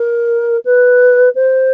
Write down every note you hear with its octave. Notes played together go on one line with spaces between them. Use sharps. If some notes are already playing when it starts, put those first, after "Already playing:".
Already playing: A#4
B4
C5